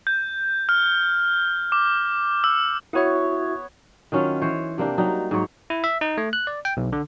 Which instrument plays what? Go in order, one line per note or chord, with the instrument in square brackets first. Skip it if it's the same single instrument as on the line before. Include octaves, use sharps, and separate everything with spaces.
[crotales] G6
F6
D6
E6
[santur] B3 C#5 [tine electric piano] E4 F#4 E5
[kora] D#3 F#3 C#4 F4
E3 C5 C#5
C3 A#3 D4 G4
F#3 G3 D#4
G#2 F#3 C#5
[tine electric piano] E4
E5
D#4
A3
F#6
D5
G5
B1
D3